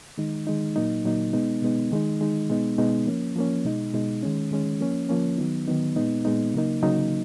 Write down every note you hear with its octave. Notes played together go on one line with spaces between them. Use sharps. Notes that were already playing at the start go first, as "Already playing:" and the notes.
D#3 G#3 D#4
D#3 G#3 D#4
A#2 F#3 A#3 D#4
A#2 F#3 A#3 D#4
B2 G#3 B3 D#4
B2 G#3 B3 D#4
D#3 G#3 D#4
D#3 G#3 D#4
B2 G#3 B3 D#4
B2 G#3 B3 D#4
F3 A#3 C#4
F3 A#3 C#4
B2 G#3 D#4
B2 G#3 D#4
D#3 G#3 C#4
D#3 G#3 C#4
F3 A#3 C#4
F3 A#3 C#4
D#3 F#3 B3 D#4
D#3 F#3 B3 D#4
A#2 G#3 B3 D#4
A#2 G#3 B3 D#4
C#3 F#3 A#3 D#4
C#3 F#3 A#3 D#4